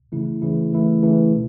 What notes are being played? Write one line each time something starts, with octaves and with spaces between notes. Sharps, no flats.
C#3 E3 A3 E4
C#3 E3 A3 E4
C#3 E3 A3 E4
C#3 E3 A3 E4
B2